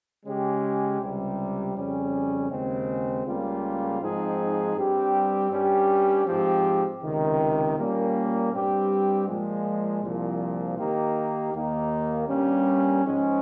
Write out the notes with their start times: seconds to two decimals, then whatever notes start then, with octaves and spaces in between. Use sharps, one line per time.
0.25 C#3 G#3 C#4 G4
1.00 C#2 C3 G3
1.74 F2 C#3 G3 C#4
2.50 D#2 C#3 G#3 C4
3.25 C#2 C#3 G3 A#3 F4
4.00 G#2 F3 C4 D#4 G#4
4.75 G2 G3 C4 G4
5.51 G2 G3 C#4 G4
6.26 G#2 F3 C4 G4
7.01 C#2 C3 D#3
7.77 A#2 G3 A#3 C#4
8.52 G2 G3 C4 G4
9.27 A#2 F3 G#3
10.02 C2 A#2 F3
10.77 D#3 A#3 D#4 G4
11.53 D#2 D#3 A#3 D#4
12.28 G2 G3 A#3 C#4
13.03 G#2 F3 G#3 C#4